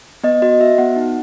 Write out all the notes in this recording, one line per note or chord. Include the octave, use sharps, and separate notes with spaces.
B3 D#5
F#4 D#5
F#4 E5
B3 F#5
D#4